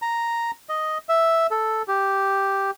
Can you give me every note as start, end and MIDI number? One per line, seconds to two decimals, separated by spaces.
0.02 0.51 82
0.69 0.98 75
1.09 1.47 76
1.51 1.82 69
1.88 2.71 67